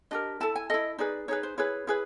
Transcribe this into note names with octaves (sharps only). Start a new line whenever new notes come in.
D4 G4 A#4 D#5
E4 A4 A5
G#5
E4 A4 D#5
D#4 G#4 B4 D5
D#4 G#4 B4 C#5
C5
E4 G#4 B4 C#5
E4 G#4 B4